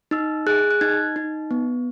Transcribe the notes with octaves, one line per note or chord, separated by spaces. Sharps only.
D#4 E6
G#4 F#6
F#6
D#4 G#6
D#4
B3